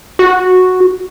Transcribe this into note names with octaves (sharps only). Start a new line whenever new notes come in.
F#4